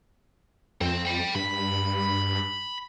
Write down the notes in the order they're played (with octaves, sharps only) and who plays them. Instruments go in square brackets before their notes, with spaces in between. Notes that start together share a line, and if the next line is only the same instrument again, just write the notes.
[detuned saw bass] F2 [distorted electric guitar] C4
[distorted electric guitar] G5 B5
[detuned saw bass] G2 [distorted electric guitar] B5